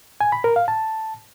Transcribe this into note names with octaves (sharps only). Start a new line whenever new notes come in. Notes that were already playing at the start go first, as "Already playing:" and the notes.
G#5
B5
A#4
F5
A5